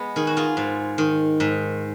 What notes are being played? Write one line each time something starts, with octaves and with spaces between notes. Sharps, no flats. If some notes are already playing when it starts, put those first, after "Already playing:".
Already playing: G#3 B3
D#3 G#4
F#4
F4 G#4
G#2
D#3
G#2